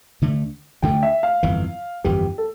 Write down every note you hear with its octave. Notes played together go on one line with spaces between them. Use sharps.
D2 D3 A3
D2 D3 A3 G5
E5
F5
G1 F2 E3
G1 F2 E3 G4
A4